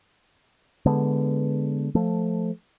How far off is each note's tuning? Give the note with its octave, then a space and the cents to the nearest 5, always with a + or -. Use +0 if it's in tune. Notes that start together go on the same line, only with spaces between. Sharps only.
D3 -10 G#3 +0 B3 +0
F3 +5 A3 +0